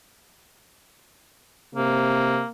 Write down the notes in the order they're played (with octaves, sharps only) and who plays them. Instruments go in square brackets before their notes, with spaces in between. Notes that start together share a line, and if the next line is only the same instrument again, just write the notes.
[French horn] C3 [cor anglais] A#3